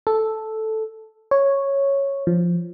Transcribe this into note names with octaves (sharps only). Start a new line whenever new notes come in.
A4
C#5
F3